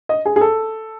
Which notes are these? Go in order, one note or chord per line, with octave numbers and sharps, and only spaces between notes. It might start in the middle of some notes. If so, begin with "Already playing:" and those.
D#5
G#4
G#4
A4